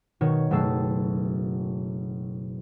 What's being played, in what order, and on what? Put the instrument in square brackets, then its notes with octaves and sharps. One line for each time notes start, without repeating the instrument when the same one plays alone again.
[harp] B2 D#3 C#5
F#1 B2 A3 A5 E6 C7